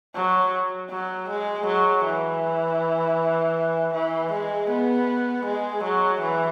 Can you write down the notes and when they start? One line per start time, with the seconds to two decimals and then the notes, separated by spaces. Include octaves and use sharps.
0.15 F#3
0.90 F#3
1.29 G#3
1.67 F#3
2.05 E3
3.94 E3
4.32 G#3
4.70 B3
5.46 G#3
5.84 F#3
6.21 E3